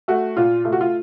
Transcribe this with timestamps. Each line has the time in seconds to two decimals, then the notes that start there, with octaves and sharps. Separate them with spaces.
0.08 A3 F#4
0.37 A#2 F4
0.65 A3 F4
0.72 F#4
0.81 F4